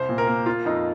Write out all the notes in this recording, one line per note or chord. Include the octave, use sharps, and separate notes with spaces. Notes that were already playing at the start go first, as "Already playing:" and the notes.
Already playing: C2 C5
A#2
A#4
A#3
A#3 F4
F2 D#4